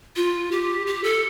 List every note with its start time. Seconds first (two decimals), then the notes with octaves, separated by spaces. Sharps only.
0.16 F4
0.51 G4
0.87 G4
1.04 A4